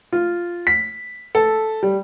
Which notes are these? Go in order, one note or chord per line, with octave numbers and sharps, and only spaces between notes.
F4
B6
A4
G3